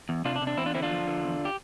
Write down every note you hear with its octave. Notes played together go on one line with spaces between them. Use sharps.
E2
C3 D4 F4
D4
C3
D4
E2 C4 E4
D4 F4
D3 C4 E4
D4 F4
F3
D3
E2
G4